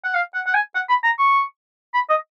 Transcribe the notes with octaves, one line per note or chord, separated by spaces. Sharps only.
F#5
F5
F#5
F#5
G#5
F#5
B5
A#5
C#6
B5
D#5